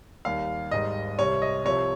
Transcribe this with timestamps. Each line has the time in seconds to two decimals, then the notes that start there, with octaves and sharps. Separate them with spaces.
0.25 D#2 D#3 G3 F5
0.71 G#1 G#2 D#3 G3 D#5
1.19 C2 C3 G3 C#5
1.42 D#5
1.64 C2 C3 F3 C#5